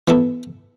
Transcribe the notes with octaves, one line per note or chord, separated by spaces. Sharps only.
E3 B3 E4 A4